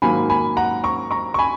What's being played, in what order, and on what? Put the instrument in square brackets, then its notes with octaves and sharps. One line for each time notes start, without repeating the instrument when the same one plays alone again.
[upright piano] G#2 D#3 F#3 A#3 G#5 B5
G#5 B5
F#5 A#5
A#5 C#6
A#5 C#6
C#6
G#5 B5